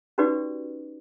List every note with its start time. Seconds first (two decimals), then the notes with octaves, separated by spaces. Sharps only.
0.18 C#4 D#4 F#4 G4 B4 D5